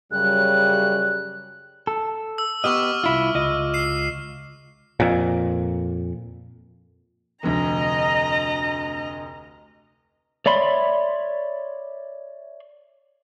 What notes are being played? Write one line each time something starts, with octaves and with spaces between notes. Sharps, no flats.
F#2 C#3 G3 F#6
A4
E6
B3 G4 D#5 C#6 D6 F6
C2 E4 F4
C#2 F4 D#5
C7 E7
F2 A#2
F1 D2 D#5 A#5
C#5 D5 E5 B5 C6